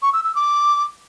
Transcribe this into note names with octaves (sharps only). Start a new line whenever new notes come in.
C#6
E6
E6
D6